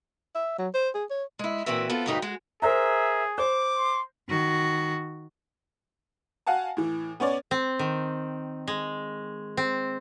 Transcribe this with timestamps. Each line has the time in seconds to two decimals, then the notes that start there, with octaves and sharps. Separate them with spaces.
0.35 E5
0.58 F#3
0.74 C5
0.94 G#4
1.10 C#5
1.39 G#3 E4
1.66 A#2 E3 C4 F#4 B4 E5
1.90 B3 C4 F4 A4
2.06 D2 G2 C#3 D#4 G4 B4
2.22 G#3 F#4
2.62 G#4 A#4 C5 E5 A#5
3.38 C5 D6
3.77 C6
4.29 D#3 F#4
6.47 F#4 F5 F#5 G#5 A5
6.77 A2 E3
7.20 B3 C#4 C#5 D5
7.51 C4
7.79 D#3
8.67 G#3
9.57 C4